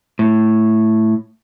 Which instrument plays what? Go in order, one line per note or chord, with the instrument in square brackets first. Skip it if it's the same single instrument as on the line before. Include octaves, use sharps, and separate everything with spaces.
[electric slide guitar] A2